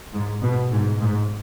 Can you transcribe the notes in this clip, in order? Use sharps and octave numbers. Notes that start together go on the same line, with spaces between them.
G#2
B2
G#2
G#2